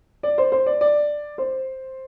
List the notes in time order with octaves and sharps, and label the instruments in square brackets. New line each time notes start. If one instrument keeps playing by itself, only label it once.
[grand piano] D5
C5
C5
D5
D5
C5